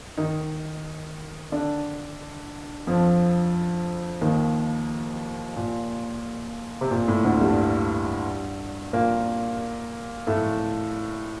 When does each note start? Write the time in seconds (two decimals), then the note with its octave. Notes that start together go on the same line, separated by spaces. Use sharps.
0.17 D#3 D#4
1.52 D3 D4
2.87 F2 F3
4.21 D#2 D#3
5.56 A#2
6.81 C3
6.91 A#2
7.08 A2
7.25 D2 D3
7.41 G2 G3
8.93 A#2 A#3
10.27 A2 A3